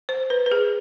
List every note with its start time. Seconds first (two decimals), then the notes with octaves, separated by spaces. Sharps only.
0.09 C5
0.30 B4
0.46 B4
0.52 G#4